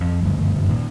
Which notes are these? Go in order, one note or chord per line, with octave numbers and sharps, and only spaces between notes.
F2
F#1 D2 G2
A#2 D#3